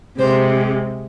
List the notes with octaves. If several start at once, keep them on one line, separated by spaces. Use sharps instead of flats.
C3 G#3 C5